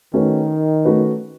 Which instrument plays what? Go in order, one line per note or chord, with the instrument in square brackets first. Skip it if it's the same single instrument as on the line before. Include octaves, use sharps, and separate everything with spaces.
[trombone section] D#3 [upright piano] A3 C#4 F#4 B4
[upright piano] A3 C#4 F#4 B4